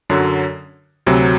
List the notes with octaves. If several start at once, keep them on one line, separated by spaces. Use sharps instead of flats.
F#2 D3 F#3
D2 C3 F#3